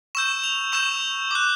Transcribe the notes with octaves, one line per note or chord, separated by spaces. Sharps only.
C#6 E6 G6 E7
F7
C#6 E6 G6 E7
D6 F#6